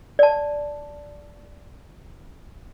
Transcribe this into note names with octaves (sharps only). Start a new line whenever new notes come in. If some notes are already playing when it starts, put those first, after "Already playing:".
D5 A5